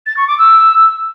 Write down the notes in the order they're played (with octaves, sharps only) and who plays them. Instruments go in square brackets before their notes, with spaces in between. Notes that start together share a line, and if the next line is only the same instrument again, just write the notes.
[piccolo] A6
C#6
D6
E6